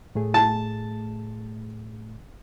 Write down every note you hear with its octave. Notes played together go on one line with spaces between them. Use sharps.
A2 A3 G#4
A5